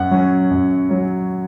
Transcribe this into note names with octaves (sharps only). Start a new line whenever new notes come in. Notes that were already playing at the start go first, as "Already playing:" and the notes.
Already playing: F#2 F#5
F#3 C#4
F#2
F#3 C#4